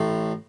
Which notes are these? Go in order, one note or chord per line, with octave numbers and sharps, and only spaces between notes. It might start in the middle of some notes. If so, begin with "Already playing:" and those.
Already playing: A1 A2